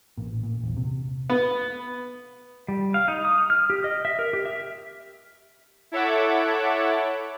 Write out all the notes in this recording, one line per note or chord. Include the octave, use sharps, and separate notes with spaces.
A1 A#2
A#2
D#1 A#1 E2
C3
B3
G3
F5
D#4
D#6
F6
G4
D#5
E5
A#4
G4
E5
E4 A4 C#5 E5 F#5 D6